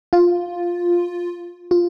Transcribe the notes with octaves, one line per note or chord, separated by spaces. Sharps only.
F4
F4